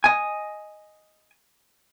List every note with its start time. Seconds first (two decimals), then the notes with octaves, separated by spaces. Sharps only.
0.04 D#5 G#5